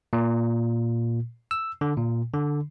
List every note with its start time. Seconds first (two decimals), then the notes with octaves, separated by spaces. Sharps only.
0.13 A#2
1.51 E6
1.81 D3
1.97 A#2
2.34 D3